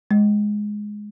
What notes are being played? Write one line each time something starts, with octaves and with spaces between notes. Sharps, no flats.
G#3